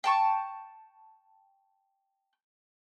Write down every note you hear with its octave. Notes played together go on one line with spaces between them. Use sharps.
G5 A5 C#6